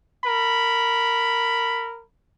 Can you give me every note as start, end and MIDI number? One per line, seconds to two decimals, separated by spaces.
0.24 2.02 70
0.24 2.02 83